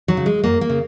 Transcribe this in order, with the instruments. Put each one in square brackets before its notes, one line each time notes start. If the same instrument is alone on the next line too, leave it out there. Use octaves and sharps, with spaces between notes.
[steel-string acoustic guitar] F#3
C#3
G#3
F#2 A#3
A#3
C#3